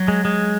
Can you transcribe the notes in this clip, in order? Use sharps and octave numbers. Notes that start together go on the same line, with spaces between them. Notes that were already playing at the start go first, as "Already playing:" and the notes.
Already playing: F#3
G#3
G#3